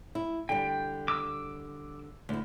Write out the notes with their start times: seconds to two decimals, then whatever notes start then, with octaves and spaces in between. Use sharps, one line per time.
0.15 E4
0.49 D3 G3 G5
1.08 D6 E6
2.29 D2 E4